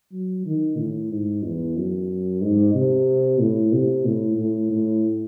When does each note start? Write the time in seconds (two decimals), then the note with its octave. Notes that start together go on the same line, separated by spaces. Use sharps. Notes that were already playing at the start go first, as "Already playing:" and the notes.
0.12 F#3
0.46 D#3
0.78 A2
1.11 G#2
1.44 E2
1.76 F#2
2.42 G#2
2.75 C3
3.40 A2
3.73 C3
4.05 A2
4.39 A2
4.72 A2